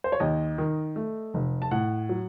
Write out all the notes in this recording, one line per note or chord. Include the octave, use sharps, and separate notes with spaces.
C5
C#5
D#2 D#5
D#3
A3
F1
A5
A2 F#5
F#3